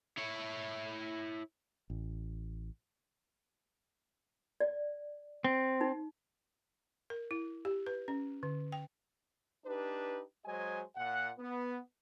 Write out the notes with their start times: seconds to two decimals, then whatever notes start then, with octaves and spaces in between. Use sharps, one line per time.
0.18 E4 C#5
1.90 A1
4.60 D5
5.44 C4
5.81 D#4
7.10 A#4
7.31 E4
7.65 G4
7.87 B4
8.08 C#4
8.43 D3
8.72 G5
9.66 D4 D#4 G4 B4
10.46 F#3 G#3 C5 D#5 G#5
10.97 A#2 F#5
11.39 B3